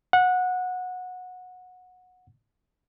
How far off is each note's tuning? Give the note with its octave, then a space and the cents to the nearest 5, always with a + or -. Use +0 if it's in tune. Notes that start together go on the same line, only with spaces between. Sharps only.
F#5 -20